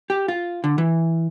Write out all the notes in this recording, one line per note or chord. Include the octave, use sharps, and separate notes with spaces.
G4
F4
D3
E3